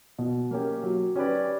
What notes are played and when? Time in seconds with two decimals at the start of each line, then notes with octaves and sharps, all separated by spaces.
0.18 B2
0.51 A#3 C#4 G4
0.83 F#3
1.16 C#4 G4 B4 D5